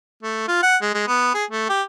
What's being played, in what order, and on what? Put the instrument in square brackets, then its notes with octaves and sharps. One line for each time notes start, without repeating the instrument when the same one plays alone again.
[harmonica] A3
F4
F#5
G#3
G#3
B3
G#4
A3
G4